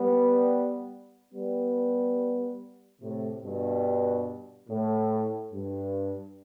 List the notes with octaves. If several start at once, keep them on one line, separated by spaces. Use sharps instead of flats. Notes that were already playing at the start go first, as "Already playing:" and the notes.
Already playing: G3 B3
G3 B3
A2 C3
G2 B2
A2
G2